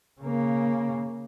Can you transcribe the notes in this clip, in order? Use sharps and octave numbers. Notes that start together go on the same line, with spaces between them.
C#3 A#3